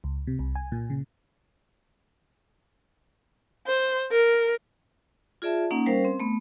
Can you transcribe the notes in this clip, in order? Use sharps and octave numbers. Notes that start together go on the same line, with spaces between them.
C#2
C3
C2
G#5
A#2
C#3
C5
A#4
F4 G#4 D5 E5 A5
A#3 C#4 D#4 F#5
G3 C#4 A#4 C5 F5
C4
A3 B3